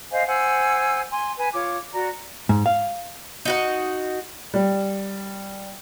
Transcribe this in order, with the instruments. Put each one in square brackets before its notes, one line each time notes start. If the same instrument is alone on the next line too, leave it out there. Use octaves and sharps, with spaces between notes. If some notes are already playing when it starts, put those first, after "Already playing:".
[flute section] C5 D#5 F5 G#5
C5 F#5 G#5 E6
G#5 C6
B4 G#5
F4 C#5 D6
F#4 D5 A#5
[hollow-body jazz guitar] G#2
F5
[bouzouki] D#4 F#4 F#5
[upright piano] G3